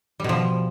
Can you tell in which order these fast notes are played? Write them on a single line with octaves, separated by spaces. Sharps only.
G3 B2 F3